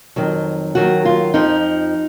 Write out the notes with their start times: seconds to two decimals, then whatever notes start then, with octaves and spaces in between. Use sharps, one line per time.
0.16 F2 D#3 F#3
0.75 D#2 D#3 F#3 F#4
1.05 F4
1.34 F2 F3 D#4